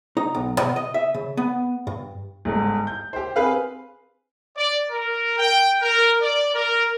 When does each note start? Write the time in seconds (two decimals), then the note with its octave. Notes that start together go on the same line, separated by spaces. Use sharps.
0.17 D#4
0.35 B1
0.60 B2
0.76 D#5
0.94 E5
1.14 C#3
1.37 B3
1.87 G2
2.45 G1 G#2
2.87 G6
3.13 G4 C5
3.36 C4 G#4 B4 F5
4.57 D5
4.90 A#4
5.39 G5
5.81 A#4
6.22 D5
6.54 A#4